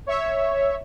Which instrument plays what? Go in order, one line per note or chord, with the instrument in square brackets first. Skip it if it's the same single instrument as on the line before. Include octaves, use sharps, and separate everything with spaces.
[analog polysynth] C#5 E5